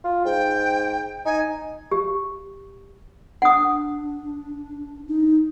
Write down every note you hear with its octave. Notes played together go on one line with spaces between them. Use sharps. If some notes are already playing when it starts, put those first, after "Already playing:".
F4
G#2 G5
D#4 G#5
G4
D4 F#5 D#6
D#4